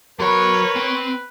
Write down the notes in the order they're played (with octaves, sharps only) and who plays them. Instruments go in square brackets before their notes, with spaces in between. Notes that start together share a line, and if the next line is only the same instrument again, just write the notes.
[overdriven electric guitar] F#3 B5 [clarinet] A#4 [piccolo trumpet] B4 [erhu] C#5
[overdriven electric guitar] C4 G5